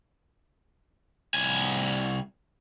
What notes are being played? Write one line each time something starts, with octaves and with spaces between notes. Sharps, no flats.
C2 G#5